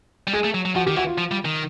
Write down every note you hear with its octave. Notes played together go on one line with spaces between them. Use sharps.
G3
G#3 G#4
A3
F#3
F#3
F3 F#4
D#3 G4
E3 F#4
F4
F3
G3
D#3